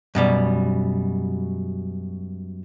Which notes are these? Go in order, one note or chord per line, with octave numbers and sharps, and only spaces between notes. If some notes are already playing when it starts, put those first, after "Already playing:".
F#2 B2 G3